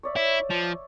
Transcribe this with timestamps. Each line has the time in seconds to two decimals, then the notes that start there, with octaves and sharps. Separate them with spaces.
0.03 C#5 D5 E5
0.16 E4
0.51 F3